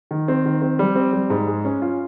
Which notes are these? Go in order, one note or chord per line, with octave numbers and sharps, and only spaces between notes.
D#3
C4
D#3
C4
G3
C4
G3
G#2
G#3
C#4
F4